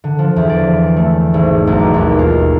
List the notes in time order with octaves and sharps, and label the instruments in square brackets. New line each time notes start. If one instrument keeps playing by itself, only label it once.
[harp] D3
F3
E2
D5
A3
G#1
B1
D6
D#2
F4